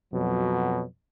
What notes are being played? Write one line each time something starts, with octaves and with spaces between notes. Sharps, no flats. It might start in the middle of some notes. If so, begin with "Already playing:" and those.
F2 B2 F#3